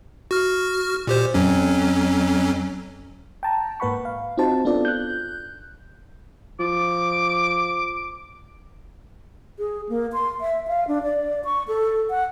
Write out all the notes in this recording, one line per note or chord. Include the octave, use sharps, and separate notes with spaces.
F#4 F6
A#2 G4 C5
F2 F#3 C#4
G5 A5 A#5
G#2 A#3 B4 F#5 B5 C#6
F5
C4 D#4 F4 F#4 C5 A5
B3 D4 F4 A4 D5
F#6 G6
F3 D6
G#4
A#3
C6
E5
F5
D4
D5
C#6
A4
F#5